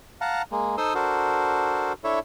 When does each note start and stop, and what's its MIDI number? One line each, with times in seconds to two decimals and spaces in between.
0.21 0.42 77
0.21 0.42 78
0.21 0.42 81
0.21 0.42 82
0.52 0.76 56
0.52 0.76 58
0.78 0.94 63
0.78 0.94 69
0.78 0.94 72
0.78 0.94 84
0.78 0.94 87
0.78 0.94 88
0.95 1.93 62
0.95 1.93 66
0.95 1.93 69
0.95 1.93 70
0.95 1.93 72
2.04 2.19 62
2.04 2.19 64
2.04 2.19 69
2.04 2.19 73
2.04 2.19 76